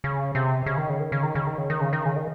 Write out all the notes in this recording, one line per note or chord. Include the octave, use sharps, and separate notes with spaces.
C#3
C3
C#3
D#3
C#3
D#3
C#3
D#3
C#3
D#3
C#3
D#3
C#3
D#3
C#3
D#3